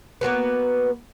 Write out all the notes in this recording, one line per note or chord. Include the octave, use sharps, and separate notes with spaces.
A#3 B3 F#4 B4